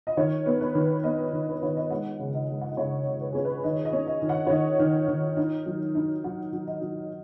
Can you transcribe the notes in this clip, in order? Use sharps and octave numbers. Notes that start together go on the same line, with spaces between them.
D#5
D#3 C#5
B3
B4
D#3
B3 D#5
D#3
B4
D#3 C#5
D#5
G#3 F#5
C#3
D#5
G#3
F#5
D#5
C#3 C#5
C#3
B4
C#4 G#4
B4
D#3 D#5
D#5
C#4
D#5
D#3
F#5
C#5
D#3 D#5
D#3
D#3
D#4
F#3
D#4
F#3 F#5
F#3
D#5
F#3